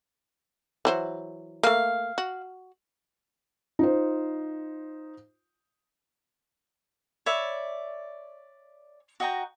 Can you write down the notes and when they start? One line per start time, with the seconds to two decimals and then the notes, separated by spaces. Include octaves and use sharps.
0.85 E3 F#3 C5
1.63 A3 A#3 F5
2.18 F#4
3.79 D#4 F4 C5
7.26 C#5 D5 E5 B5
9.20 F#4 D#5 G5 A#5